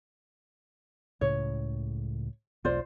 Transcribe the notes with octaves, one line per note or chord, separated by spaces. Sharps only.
C#2 A2 C#3 C#5
E1 B1 F4 C5 D5